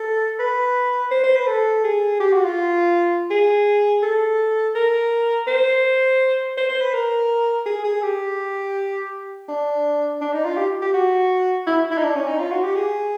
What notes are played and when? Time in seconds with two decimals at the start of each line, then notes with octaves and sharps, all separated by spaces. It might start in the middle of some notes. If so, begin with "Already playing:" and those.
Already playing: A4
0.39 B4
1.11 C5
1.23 C5
1.36 B4
1.47 A4
1.84 G#4
2.20 G4
2.33 F#4
2.44 F4
3.30 G#4
4.03 A4
4.75 A#4
5.47 C5
6.57 C5
6.69 C5
6.81 B4
6.94 A#4
7.66 G#4
7.84 G#4
8.03 G4
9.48 D4
10.22 D4
10.33 D#4
10.45 F4
10.57 G4
10.82 G4
10.94 F#4
11.67 E4
11.91 E4
11.98 D#4
12.03 D4
12.15 C#4
12.28 D#4
12.40 F4
12.52 F#4
12.64 G4
12.75 G#4